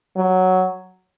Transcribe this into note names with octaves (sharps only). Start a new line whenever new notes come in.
F#3